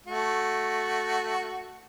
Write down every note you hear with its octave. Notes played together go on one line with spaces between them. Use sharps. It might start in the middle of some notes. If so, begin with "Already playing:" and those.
A3 F#4